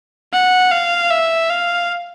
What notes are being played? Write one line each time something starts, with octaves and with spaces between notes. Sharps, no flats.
F#5
F5
E5
F5